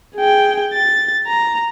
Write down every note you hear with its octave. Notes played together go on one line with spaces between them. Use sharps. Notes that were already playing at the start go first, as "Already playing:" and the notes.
G#4 G5
A6
A#5